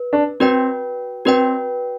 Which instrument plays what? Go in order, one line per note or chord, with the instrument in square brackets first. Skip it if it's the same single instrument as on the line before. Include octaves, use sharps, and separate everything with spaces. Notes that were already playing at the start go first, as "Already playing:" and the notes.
Already playing: [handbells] B4
[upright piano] D4
[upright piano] C4 [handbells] F#4 B4 D5 G5
[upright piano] C4 [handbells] F#4 B4 D5 G5